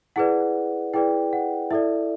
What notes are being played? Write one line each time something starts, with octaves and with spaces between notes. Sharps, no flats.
E4 G#4 B4 D5 F#5
E4 G#4 B4 D5 G5
F#5
E4 A4 D5 E5